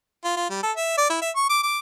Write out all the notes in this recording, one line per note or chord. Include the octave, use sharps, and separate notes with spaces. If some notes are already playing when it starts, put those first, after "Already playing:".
F4
F4
G3
A4
E5
D5
E4
E5
C#6
D6
D6